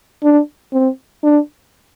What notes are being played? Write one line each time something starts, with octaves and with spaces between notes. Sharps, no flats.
D4
C4
D4